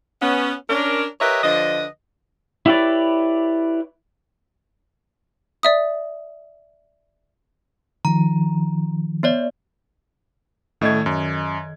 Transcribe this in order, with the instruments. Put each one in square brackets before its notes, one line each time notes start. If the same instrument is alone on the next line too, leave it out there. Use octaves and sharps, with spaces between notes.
[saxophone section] B3 C#4
C#4 D4 A#4
G4 A#4 B4 C#5 D#5 E5
D3 F3 B4 D#5
[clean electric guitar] E4 G4 B4 C#5 D5
[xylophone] D5 E5 D#6
[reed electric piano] D#3 F3 [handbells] A#5
[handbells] B3 C#5 D5
[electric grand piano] A2 A3 G#6 [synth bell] D#3 D#5
[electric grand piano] F#2